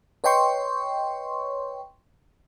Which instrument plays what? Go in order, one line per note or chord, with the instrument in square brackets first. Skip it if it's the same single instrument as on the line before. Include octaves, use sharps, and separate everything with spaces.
[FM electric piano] B4 C#5 D#5 G5 C6 C#6